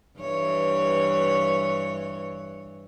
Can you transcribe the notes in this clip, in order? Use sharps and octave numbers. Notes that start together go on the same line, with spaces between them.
G2 E3 C#5